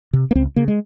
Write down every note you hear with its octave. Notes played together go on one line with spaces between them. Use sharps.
C3
A#3
C#2 C4
C#3 A#3
G#3